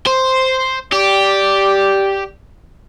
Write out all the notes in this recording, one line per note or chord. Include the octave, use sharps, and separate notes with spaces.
C5
G4 D5